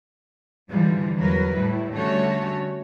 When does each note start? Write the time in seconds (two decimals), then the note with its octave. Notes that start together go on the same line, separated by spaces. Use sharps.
0.70 G#2 D3 E3 F3 G3
1.18 E2 F#3 A#4 B4
1.57 A2 G3 E4
1.93 D3 G3 A3 C#4 F#4 C#5